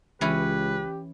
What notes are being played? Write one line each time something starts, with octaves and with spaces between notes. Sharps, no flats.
C#2 E3 C#4 G4 B4